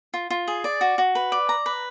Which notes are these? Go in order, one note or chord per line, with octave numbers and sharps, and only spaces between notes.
F4
F4
G#4
D5
F#4
F#4
B4
D5
A#5
B4